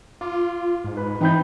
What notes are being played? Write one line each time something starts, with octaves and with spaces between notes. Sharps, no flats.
F4 D6
G#2
B4
E3 C4 D#4 G5 B5 G6